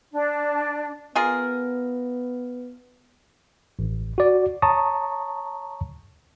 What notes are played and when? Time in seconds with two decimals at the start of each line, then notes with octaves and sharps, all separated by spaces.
0.12 D4
1.15 B3 F4 G#4 A#4
3.79 A1
4.18 F#4 D5
4.62 C#5 A5 A#5 C#6 D#6